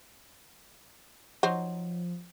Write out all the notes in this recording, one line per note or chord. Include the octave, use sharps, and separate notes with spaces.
F3 F#3 D#4 C5